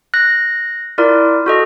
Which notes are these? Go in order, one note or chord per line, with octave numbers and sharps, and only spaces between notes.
F#6 A#6
E4 F4 A#4 D5
F#4 A4 D#5